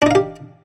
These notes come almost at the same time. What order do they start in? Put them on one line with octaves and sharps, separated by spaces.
D4 D#4 F5 G4